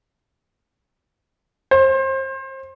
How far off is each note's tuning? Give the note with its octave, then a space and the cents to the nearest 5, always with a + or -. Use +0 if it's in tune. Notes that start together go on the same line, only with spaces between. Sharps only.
C5 +30